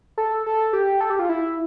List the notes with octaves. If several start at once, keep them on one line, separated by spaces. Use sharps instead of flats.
A4
A4
G4
A4
G4
F4
E4